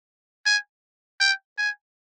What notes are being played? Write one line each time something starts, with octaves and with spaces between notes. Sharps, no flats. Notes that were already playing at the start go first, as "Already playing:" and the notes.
G#5
G5
G#5